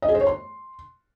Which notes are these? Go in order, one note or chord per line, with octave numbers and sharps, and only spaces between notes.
D#5
G#4
C5
C#5
C6